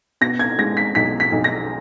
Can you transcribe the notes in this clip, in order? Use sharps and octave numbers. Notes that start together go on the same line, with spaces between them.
B2 A#6
G#6
G#3 A#6
B6
B1 B6
B6
B1
A#6